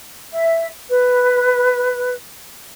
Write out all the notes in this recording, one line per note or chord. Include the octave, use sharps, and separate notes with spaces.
E5
B4